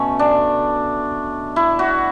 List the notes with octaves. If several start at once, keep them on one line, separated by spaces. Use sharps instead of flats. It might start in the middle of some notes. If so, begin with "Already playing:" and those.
Already playing: B2 A3 C#4
D4
E4
F#4